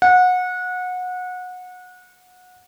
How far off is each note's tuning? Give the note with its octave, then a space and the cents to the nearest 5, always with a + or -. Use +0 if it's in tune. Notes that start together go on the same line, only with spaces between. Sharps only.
F#5 -25